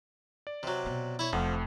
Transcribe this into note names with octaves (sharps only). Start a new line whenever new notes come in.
D5
C3 F#3
B2
E4 C#5
F1 F2 F3 A3 F#5